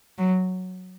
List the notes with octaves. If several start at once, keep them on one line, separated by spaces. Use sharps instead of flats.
F#3